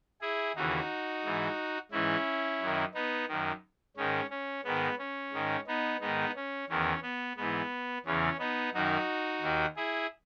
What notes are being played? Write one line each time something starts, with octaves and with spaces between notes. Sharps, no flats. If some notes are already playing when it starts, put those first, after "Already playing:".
E4 G#4
D#2 C#3 E3 D#4 F#4
G#2 E3
G#2 E3 C#4 E4
F#2 D#3
B3 D#4
F#2 D#3
G#2 D#3 C#4
C#4
G#2 D#3 B3
C#4
G#2 D#3
B3 D#4
G#2 D#3 B3 D#4
C#4
E2 D#3 C#4
B3
G#2 E3 B3
E2 C#3 E3 C#4
B3 D#4
F#2 D#3 D#4 F#4
D#2 D#3
E4 G#4